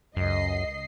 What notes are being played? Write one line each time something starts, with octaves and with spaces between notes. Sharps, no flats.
C#2 F#2 D#5 C7